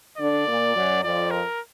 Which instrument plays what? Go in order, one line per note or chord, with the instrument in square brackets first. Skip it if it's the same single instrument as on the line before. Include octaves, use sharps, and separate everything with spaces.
[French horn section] D3 D4 [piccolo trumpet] D5
[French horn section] A#2 A#3
F#2 F#3
[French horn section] F2 F3 [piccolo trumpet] D5
[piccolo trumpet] A#4